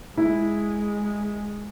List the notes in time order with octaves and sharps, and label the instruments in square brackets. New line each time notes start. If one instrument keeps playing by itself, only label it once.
[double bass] G#3 [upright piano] E4